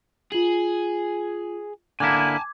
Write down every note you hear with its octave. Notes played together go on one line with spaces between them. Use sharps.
F4 G#4 F#7
D3 A#3 E4 G#5 A5 D6 G#6